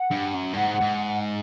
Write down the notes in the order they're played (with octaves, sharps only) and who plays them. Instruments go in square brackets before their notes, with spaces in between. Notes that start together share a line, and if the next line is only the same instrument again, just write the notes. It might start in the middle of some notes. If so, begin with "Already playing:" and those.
Already playing: [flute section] F#5
[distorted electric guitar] G2
F#2
G2
[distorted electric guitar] G#2 [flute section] F#5
[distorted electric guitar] G#2